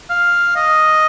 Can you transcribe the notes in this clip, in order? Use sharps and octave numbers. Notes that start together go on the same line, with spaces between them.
F5
D#5